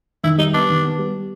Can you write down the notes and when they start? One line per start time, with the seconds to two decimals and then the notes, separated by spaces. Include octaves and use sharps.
0.24 D#3 E4
0.38 G3 D#4
0.53 B3 D4
0.69 D#3
0.83 B3
0.99 G3